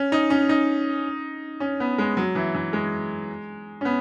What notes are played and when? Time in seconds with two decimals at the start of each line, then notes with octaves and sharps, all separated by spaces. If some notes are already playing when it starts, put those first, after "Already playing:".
Already playing: C#4
0.12 D#4
0.30 C#4
0.49 D#4
1.60 C#4
1.80 B3
1.98 G#3
2.17 F#3
2.35 E3
2.55 E3
2.73 G#3
3.81 C#4
3.85 B3